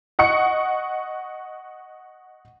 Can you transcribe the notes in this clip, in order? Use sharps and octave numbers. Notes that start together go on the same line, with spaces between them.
D#5 F#5 C#6 C#7